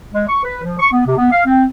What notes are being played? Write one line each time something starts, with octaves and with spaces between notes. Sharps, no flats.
G#3
C#6
B4
F3
C#6
B3
C3
B3
F5
C4